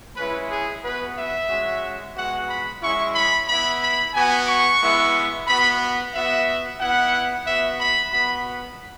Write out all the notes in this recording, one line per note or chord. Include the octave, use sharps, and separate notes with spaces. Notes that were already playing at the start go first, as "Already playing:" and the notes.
G#3 C#4 E4 B4
G#4
B3 F#4 B4
E5
G#3 C#4 F#4
G#3 B3 F#4 F#5
B5
G#3 C#4 E4 C#6
B5
B3 E4 B5
B5
B3 F#4 G#5
C#6
G#3 B3 E4
B3 F#4 B5
B3 F#4 E5
B3 E4 F#5
B3 F#4 E5
B5
B3 F#4 B5